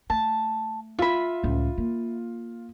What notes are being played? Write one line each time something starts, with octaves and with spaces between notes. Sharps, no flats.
A3 A5
F4 E5 B5
C#2 A2
A#3